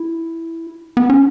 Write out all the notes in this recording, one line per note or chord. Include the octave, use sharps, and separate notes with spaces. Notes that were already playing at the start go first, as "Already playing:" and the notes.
Already playing: E4
B3
C#4